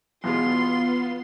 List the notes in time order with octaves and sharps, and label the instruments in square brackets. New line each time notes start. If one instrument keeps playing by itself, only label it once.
[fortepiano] E2 B2 G#3 [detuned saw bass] B3 [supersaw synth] F4 [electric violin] C6